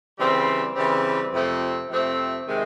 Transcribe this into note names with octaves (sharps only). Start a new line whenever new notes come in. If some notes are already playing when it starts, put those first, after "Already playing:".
C#3 E3 G3 C4
C#3 E3 G3 C4
F2 C3 F3 A3 C4
F2 C3 F3 A3 C4
C3 D#3 G#3